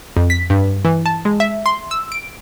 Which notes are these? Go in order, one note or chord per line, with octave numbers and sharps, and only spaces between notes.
F2
B6
G2
E3
A5
G#3
E5
C6
E6
D7